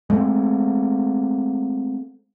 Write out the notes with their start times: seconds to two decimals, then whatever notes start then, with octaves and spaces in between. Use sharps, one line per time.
0.10 G#3 A3 C4